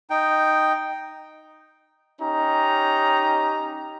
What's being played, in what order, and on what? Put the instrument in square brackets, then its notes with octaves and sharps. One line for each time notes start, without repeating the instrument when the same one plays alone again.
[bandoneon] D#4 G5
[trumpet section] C#4 D#4 G4 A#5